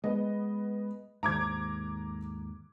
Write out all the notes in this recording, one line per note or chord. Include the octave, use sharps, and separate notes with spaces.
G#3 B3 D#5
D#2 G#2 A#5 D6 G#6